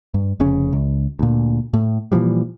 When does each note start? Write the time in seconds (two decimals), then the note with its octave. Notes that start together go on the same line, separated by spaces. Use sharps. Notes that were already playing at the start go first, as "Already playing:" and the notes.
0.14 G2
0.40 F1 C#3 C#4
0.73 C#2
1.19 D2 A#2
1.73 A2
2.12 A#2 E3 F3 G3